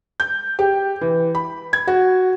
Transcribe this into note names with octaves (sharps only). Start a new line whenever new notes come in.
G6
G4
E3
B5
G#6
F#4